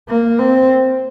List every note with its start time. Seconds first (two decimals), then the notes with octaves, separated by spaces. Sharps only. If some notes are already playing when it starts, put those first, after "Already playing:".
0.09 A#3
0.39 C4